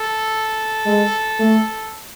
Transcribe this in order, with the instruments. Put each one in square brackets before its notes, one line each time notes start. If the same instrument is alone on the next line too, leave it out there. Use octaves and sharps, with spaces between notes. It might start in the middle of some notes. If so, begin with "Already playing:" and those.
Already playing: [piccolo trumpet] A4
[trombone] G#3
A3